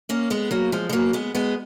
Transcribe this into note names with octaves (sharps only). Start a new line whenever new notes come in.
A#3 C#4
G#3 B3
F#3 A#3
F3 G#3
G#3
F#3 A#3
G#3 B3
G#3 B3